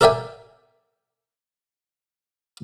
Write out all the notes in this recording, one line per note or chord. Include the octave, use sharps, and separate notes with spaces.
A4 A#4 D5 E5 G5 G#5